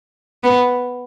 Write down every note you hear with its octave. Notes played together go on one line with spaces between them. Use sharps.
B3